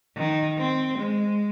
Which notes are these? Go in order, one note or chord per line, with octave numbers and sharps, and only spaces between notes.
D#3
C4
G#3